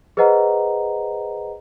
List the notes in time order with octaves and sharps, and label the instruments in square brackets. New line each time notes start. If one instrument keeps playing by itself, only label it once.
[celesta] G#4 B4 C5 D#5 F#5 A#5